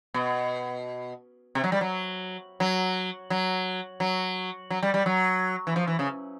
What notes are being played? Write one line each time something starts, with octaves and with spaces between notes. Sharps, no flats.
B2
C3
F#3
G3
F#3
F#3
F#3
F#3
F#3
G3
G3
F#3
E3
F3
E3
C#3